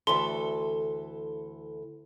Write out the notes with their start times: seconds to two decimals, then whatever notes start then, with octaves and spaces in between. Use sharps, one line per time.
0.07 D2 E3 A4 C6